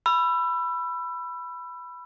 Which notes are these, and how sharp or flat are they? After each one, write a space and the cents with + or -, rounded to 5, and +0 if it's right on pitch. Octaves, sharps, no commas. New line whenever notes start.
B5 +0 E6 +30